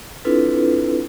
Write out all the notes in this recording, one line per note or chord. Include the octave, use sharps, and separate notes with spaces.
C4 D4 E4 F4 A4 B4